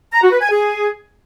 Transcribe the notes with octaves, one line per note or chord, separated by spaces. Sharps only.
A#5
F#4
B4
G#5
G#4